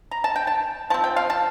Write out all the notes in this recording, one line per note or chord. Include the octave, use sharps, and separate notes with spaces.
A#5
A5
G5
A5
F3 C4 A5
G5
F5
A5